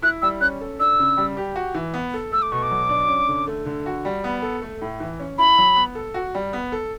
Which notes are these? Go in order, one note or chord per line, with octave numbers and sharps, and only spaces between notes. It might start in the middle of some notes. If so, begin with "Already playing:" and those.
E4 F#6
G3 E6
C#4 F#6
A4
D4 E6
C#3
G3
G4
F#4
E3
B3
A4
A3 E6
D6
B2 C#6
D6
F#3
D4
C#4
D3
A3
D3
F#4
G3
B3
A4
A3
A2
E3
C#4
E4 B5
F#3
B3
A4
F#4
G3
B3
A4